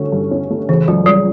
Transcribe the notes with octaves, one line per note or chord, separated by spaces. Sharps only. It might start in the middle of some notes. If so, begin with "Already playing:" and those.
Already playing: G2 D3 A3 C#4
G2
C#4
A3
C#3 E3
C#2 F#3
C#2 G3